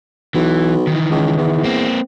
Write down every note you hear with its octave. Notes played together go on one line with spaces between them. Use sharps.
B1 E3
D#3 E3
C#2
E2
A#3 C4